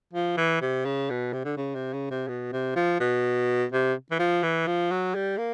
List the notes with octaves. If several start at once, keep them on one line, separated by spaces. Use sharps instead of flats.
F3
E3
C3
C#3
B2
C3
D3
C#3
C3
C#3
C3
B2
C3
F3
B2
C3
E3
F3
E3
F3
F#3
G3
A#3